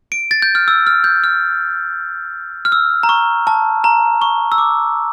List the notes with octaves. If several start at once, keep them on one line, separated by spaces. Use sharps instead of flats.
D7
A6
G6
F6
E6
F6
G6
F6
F6
E6
A#5
C#6
A5
A#5
C#6
E6
D6